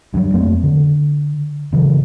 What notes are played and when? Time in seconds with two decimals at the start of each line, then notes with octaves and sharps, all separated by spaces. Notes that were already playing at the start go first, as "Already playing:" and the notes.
0.14 G2 F#3
0.33 F2 A3 A#3 C4
0.64 D3
1.72 G#1 C#3 E3 F#3